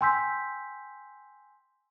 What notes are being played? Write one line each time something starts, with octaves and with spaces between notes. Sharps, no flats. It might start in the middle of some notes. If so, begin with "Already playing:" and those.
G5 G#5 C6 E6 G6 B6